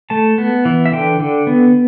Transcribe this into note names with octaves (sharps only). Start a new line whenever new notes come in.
A3 A5
B3
E3
E5
D3 G5
D3
B3